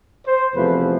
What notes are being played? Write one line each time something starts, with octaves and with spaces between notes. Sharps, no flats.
C5
E2 C3 F3 A3 B4